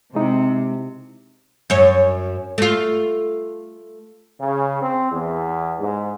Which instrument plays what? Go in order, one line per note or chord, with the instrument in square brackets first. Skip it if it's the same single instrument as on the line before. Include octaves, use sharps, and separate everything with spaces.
[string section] C3 [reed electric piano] G#3 D#4 E4
[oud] F#2 C#5
A3 F4
[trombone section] C#3
C4
E2
G#2